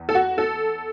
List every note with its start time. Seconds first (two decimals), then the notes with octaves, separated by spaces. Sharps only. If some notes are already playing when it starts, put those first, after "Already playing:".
Already playing: E2
0.09 A4
0.15 F#4
0.38 A4